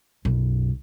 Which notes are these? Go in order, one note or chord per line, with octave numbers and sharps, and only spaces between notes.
B1 F#2